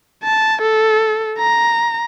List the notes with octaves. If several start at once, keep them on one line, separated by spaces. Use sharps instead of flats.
A5
A4
A#5